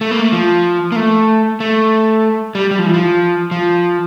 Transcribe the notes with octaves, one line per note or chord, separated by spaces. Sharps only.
A3
A#3
A3
F3
A#3
A3
A3
G3
G3
F3
E3
F3
F3